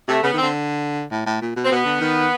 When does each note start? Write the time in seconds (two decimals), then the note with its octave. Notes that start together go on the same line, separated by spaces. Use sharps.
0.08 C3 A3
0.23 C#3 B3
0.34 D#3
0.38 D3 C4
1.11 A2
1.26 A2
1.41 A#2
1.56 B2
1.64 C4
1.71 B2 B3
1.85 D3
2.01 D#3